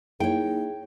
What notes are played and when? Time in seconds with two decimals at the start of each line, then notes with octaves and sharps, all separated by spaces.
0.20 A#3 D#4 E4 G#4 C#5 G5